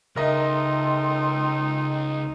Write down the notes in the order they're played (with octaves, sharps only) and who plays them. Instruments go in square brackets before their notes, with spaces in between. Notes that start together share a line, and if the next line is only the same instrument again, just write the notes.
[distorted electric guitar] C#2 [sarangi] D#4 [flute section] A4 G5 C6 [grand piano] A#4 D#5 E5